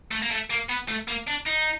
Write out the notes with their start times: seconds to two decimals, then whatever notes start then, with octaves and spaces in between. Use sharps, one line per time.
0.12 A3
0.22 A#3
0.31 A3
0.50 A#3
0.69 B3
0.88 A3
1.08 A#3
1.27 D4
1.46 D#4